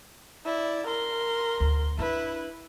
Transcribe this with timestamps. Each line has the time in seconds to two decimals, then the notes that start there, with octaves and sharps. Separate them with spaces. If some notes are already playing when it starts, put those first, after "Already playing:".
0.45 E4 D5
0.87 A#4 C6
1.60 D2
1.99 D4 E4 B4